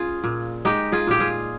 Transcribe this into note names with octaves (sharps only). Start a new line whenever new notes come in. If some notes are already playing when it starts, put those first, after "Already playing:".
Already playing: C#4 F4 G#4
A#2
G#3 D#4 G4
F4 G#4
A#2 G4
F4 G#4